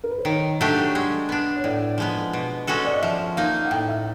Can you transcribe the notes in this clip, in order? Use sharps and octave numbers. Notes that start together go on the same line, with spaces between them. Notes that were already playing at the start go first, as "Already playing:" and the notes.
A#4
B4
C5
D#3 C#5
F#3 A3 D4 G4
G#3
B3 D4
C#5
A2 D5
F3 G#3 B3
B2
G#3 C#4 F#4 A4
D5
D#5
F3 E5
A#3 D#4 F5
F#5
A2 G5
E5